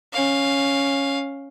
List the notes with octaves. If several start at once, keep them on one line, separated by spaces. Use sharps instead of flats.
C#4 F5